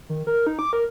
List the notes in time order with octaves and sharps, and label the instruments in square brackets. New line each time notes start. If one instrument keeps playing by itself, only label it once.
[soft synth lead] D#3
A#4
D#4
D6
A#4